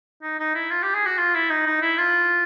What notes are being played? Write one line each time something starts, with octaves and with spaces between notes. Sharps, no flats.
D#4
D#4
E4
F4
G4
G#4
F#4
F4
E4
D#4
D#4
E4
F4